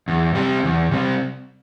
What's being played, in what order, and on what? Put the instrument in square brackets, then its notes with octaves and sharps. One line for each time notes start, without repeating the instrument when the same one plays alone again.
[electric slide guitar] E2
C3 G3 C4 G4
E2
C3 G3 C4